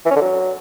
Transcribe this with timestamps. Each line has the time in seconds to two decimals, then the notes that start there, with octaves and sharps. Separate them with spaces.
0.06 E3
0.11 C#4
0.16 D3
0.21 F#3